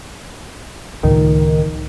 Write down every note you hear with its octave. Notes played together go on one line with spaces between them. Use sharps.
C#2 A2 D#3 F3